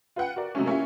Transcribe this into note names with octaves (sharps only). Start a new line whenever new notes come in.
F4 B4 F#5 G5
F#4 A#4 D5
C3 F#3 G#3 A3 C#4
A#3 C#4 E4 F4 G4